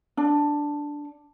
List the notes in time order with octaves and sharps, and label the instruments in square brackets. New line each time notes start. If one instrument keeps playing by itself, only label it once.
[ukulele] D4